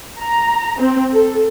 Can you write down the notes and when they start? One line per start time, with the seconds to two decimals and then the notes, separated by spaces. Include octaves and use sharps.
0.21 A#5
0.81 C4
1.12 A4